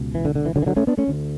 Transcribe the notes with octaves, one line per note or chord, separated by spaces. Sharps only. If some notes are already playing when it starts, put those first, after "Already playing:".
Already playing: C#2 B2
E3
D3
D3
E3
D3 F#3
E3
D3 F#3
A3 C#4
B3 D4
A3 C#4
D2 D3